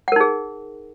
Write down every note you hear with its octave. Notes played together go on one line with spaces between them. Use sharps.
D#4 G#4 A#4 F#5